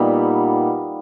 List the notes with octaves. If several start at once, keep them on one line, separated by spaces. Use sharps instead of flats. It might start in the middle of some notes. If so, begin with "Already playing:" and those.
Already playing: A#2 G3 B3 D#4